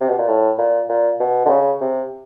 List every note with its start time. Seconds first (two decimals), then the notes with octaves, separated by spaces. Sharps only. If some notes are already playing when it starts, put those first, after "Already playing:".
0.01 C3
0.09 B2
0.19 A#2
0.28 A2
0.58 A#2
0.89 A#2
1.20 B2
1.46 D3
1.50 C#3
1.81 C3